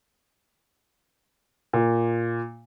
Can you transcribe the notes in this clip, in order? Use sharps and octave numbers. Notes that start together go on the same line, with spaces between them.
A#2